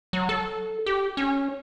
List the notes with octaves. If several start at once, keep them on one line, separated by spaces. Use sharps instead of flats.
F#3
A4
G4
C#4